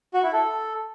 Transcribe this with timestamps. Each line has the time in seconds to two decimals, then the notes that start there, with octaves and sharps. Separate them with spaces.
0.14 F#4
0.23 E4
0.33 A4